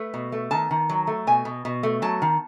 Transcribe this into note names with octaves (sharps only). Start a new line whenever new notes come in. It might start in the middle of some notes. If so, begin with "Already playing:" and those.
Already playing: A3 B4
B2
A3
D#3 A5
D#3
F#3
A3
B2 G#5
B2
B2
A3
F#3 A5
D#3